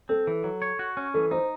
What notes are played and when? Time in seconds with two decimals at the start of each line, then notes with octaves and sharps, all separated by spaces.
0.09 C4 A4
0.27 E3
0.44 F#3
0.62 C#5
0.79 F#4
0.97 C#4
1.14 E3 A4
1.31 D#4 C5